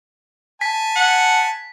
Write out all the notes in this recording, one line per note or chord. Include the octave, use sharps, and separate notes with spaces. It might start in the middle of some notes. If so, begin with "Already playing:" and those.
G#5 A5 B6
F#5